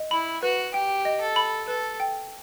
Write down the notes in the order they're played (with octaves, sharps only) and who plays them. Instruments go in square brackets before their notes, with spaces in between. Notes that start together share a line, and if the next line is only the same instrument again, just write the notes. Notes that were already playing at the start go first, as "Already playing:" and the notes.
Already playing: [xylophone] D#5
[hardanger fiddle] E4 [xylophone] B5
[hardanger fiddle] F#4 [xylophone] B4
[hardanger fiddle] G4 [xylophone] G5
[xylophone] D#5
[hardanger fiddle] A4
[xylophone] B5
[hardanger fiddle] A4 [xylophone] B4
[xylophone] G5